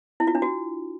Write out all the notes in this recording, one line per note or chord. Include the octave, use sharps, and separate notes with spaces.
E4
F4
D4
F#4